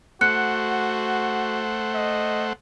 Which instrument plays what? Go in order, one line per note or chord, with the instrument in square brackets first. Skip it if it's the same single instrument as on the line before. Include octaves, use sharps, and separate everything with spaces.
[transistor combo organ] A3 C5 F#5 [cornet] F#4 [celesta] F#6 C#7
[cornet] D#5